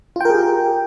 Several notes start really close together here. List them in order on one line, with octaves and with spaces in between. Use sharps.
F4 G5 A#4 G#4 G4